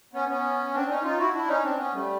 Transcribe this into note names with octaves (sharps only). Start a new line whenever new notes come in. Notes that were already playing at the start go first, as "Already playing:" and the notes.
B3 C#4
B3 C#4
C4 D4
C#4 D#4
D#4 F4
E4 F#4
D4 E4
C#4 D#4
C4 D4
B3 C#4
G3 A3